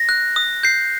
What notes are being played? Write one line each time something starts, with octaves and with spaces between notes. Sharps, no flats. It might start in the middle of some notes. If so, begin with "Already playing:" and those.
Already playing: A#6
F#6
D#6
G6 C7